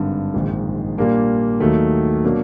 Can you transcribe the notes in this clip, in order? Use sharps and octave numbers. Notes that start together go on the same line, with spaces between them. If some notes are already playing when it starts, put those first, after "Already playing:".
Already playing: G#1 G2 D3
A#1 G#2 D#3
A#2 G3 A#3 D4
D#2 D#3 F#3 A3
B2 F#3 A#3 D4